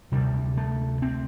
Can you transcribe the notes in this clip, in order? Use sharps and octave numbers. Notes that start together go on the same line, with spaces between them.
D2 C3 G3
A3
C4